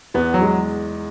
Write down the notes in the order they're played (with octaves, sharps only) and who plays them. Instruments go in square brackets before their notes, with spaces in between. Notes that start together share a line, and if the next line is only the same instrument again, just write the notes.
[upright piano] E2 [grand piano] B3
[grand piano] F#3
[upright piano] G#3